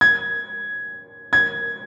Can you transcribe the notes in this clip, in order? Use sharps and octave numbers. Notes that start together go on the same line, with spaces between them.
G#6
G#6